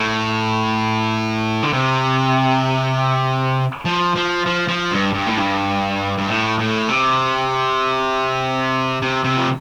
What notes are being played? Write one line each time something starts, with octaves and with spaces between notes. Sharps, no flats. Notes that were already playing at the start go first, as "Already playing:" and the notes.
Already playing: A2
D3
C3
F3
F3
F3
F3
G2
G2
A2
G2
G2
A2
A2
C3
C3
C3
F3